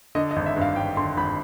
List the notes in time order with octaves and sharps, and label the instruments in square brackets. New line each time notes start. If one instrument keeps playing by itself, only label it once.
[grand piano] D3 D#5
D#5
G#1
E5
G2
F5
G#1 G5
D3 C6
G#1 B5